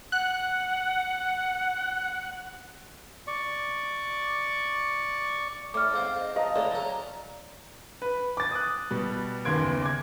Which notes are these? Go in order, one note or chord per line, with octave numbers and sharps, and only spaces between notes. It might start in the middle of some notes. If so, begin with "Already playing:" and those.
F#5 F#6
D5 C#6
A2 D5 D6 F6
G#2 C4 F5
D#5
D#5 F5 A5 A#5
C#2 A2 G#3 D5
F#3 C#4
B4
D6 A6
D#6 F#6
B2 G3
F#1 D#2 B3 C6 G#6 D7
D6 G#6